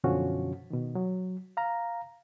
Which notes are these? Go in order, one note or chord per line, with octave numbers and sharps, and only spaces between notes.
F#2 B2 D3 F3 C#4 F#4
B2 D#3
F#3
F5 A#5